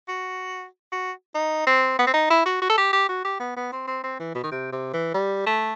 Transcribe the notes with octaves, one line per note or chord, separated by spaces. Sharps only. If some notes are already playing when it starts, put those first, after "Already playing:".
F#4
F#4
D#4
C4
B3
C4
D#4
E4
F#4
F#4
A4
G4
G4
F#4
G4
B3
B3
C4
C4
C4
E3
B2
D#3
C3
C3
E3
G3
A3